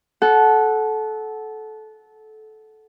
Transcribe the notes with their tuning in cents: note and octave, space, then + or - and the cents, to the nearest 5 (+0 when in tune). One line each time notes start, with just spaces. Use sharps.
A4 -20 F#5 +0